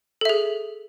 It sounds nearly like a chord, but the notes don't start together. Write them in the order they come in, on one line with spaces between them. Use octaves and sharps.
A4 E5 G#4